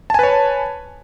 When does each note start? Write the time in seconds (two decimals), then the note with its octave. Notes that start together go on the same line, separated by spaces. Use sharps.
0.10 A5
0.14 G#5
0.19 B4
0.23 C#5